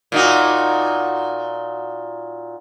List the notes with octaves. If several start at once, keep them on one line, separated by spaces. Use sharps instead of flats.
A#2 D#4 F#4